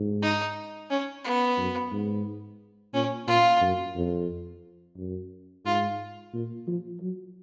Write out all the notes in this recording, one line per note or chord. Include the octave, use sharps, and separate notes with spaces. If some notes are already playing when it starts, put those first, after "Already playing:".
Already playing: G#2
D#4
C#4
B3
F#2
G#2
A#2 C#4
A#2 F4
F#2
F2
F#2
G#2 F4
A#2
F3
F#3